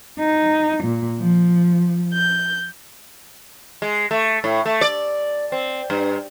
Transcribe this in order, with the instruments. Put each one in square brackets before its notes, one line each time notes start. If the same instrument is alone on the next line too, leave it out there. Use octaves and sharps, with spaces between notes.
[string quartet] D#4
A#2
F3
G6
[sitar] G#3
A3
A2
A3
D5
C4
G2